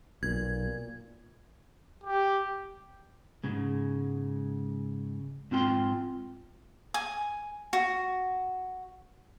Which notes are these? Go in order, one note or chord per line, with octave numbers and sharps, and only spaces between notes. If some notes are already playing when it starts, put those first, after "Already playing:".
B1 A#2 G#6
G4
G#2 C#3 G#3
G#2 C4 F4 G5 C6
G#5
F#4